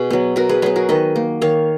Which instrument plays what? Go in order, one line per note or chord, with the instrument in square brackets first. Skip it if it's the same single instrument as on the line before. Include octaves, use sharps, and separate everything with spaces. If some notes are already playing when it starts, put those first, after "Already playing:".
Already playing: [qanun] B2 G#4
F#3 B3
B2 F#4 A#4
G#4 B4
F#3 B3 G#4 B4
F#4 A#4
D#3 B4 D#5
A#3
D#3 C#5 F5